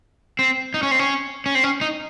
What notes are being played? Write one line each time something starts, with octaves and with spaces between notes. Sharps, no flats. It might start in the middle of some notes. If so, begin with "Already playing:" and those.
C4
D#4
C#4
C4
C#4
C#4
C4
C#4
D#4